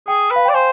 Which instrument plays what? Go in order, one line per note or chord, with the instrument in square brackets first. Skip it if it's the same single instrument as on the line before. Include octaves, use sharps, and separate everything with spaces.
[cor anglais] G#4 [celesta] G5
[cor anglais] B4
[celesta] F5
[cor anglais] D5 [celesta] G5
[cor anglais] C5 [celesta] G#5